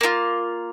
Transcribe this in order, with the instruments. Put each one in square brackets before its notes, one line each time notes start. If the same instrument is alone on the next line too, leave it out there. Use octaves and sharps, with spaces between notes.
[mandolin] A#3 D4 F4